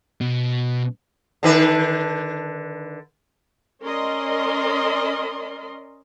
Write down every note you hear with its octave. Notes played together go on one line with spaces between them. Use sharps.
B2
D3 D#3 B4
C#4 A#4 D5 D#5 C6